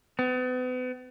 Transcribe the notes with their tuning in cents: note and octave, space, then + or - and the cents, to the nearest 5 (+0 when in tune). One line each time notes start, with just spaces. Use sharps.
B3 +40